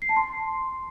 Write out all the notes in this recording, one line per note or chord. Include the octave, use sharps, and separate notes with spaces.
C7
A5
C6